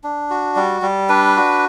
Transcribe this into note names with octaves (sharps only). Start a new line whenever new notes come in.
D4
F#4
G3
G3
D4 B4
F#4